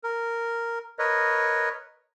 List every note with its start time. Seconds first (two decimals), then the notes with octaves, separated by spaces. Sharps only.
0.04 A#4
0.99 A#4 B4 C#5 D#5